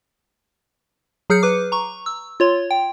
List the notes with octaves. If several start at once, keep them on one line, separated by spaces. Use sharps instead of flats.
F#3 G#4 F6 G6 C#7
B4 D6
A#5 C#6
E6
F4 C#5 C6
G5